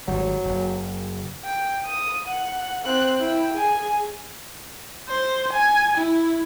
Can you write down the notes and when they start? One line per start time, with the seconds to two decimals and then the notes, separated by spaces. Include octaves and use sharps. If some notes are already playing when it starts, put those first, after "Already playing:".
0.08 G#1 F#3 G3
0.45 F#1
1.45 G5
1.86 D#6
2.27 F#5
2.85 C4 F#6
3.20 E4 G5
3.53 G#4 G#5
5.08 C5
5.53 G#5
5.97 E4